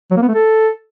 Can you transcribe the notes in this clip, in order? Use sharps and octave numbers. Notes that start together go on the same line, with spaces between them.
F#3
A#3
B3
A3
A4